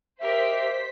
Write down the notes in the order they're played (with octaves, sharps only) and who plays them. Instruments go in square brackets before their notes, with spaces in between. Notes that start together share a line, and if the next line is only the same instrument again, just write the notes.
[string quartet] G4 A#4 D#5 [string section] C5 B6 [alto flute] E5